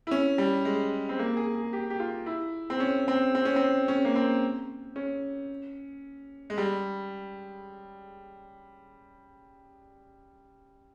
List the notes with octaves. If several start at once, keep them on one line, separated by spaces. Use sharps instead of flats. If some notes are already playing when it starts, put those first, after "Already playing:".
E4
C#4
G3
G#3
C4
A#3
G#4
G#4
G4
G4
F4
E4
C4
C#4
C4
C4
C#4
C4
C#4
A#3
C4
C#4
G#3
G3